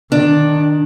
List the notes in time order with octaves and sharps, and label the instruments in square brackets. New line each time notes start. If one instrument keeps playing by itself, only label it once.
[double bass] D#3 [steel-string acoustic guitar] D4